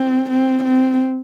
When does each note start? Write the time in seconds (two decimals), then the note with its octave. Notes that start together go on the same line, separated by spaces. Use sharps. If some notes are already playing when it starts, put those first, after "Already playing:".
Already playing: C4
0.30 C4
0.64 C4